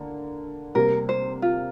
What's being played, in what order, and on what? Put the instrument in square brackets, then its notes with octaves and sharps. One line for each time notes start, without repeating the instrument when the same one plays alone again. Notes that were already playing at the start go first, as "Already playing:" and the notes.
Already playing: [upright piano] D3 A#3
[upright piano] C3 G3 A#3 [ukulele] A#4
[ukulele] C5
F4